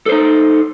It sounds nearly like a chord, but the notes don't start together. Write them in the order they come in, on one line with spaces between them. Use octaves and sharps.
A4 C5 D#4